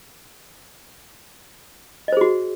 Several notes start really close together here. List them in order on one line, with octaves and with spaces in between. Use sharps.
D#5 C5 G#4 F#4